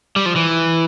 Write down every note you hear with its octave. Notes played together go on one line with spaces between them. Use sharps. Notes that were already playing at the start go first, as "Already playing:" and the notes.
G3
F3
E3